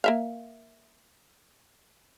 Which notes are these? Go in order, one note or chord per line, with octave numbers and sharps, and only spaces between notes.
A#3 E5 F5